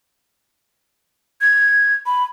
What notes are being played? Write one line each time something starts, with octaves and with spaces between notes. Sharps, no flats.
G#6
B5